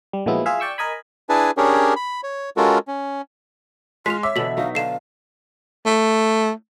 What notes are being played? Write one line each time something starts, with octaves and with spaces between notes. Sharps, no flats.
G3
A#2 F3 F#3 G#3 B3 E4
F4 G#4 E5 F5
D5 G5 C#6 E6
A#4 D#5 G#5 B5
D4 E4 G#4 B4 G#5 A5
C#4 D4 G4 G#4 A#4 C#5
B5
C#5
G#3 C#4 F4 F#4 A4 A#4
C#4
G#3 F4 C6 B6 F7
C#5 E5 D6
B2 D3 E3 B6 F#7
F#3 D#4 F5
D3 F5 C7 E7
A3